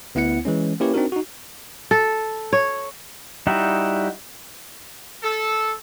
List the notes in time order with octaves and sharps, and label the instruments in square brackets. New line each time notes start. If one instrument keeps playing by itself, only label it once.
[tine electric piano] D2 B3 E4 F#5 C#7
E3 G#3 C#4
A#3 C#4 E4 G4 B4 C#5
C4 D4 D#4 F#4 A#4
D#4 F#4
[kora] A4
C#5
[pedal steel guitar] G3 D#4 E4 F#4
[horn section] A4